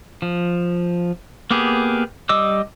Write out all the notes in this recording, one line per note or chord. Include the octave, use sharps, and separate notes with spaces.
F3
A#3 B3 G4 G#4
G3 D#5 D6 E6